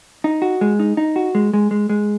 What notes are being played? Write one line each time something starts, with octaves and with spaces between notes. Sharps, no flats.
D#4
F#4
G#3
D#4
D#4
F#4
G#3
G#3
G#3
G#3